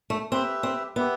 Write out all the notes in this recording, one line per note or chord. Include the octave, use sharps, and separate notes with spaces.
A3
C4 G4 B4 E5
C4
B3 G4 B4 E5